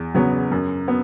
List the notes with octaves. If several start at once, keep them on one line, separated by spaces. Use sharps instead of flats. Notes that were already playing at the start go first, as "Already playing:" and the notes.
Already playing: E2
C#3 F#3 B3
F#2
B3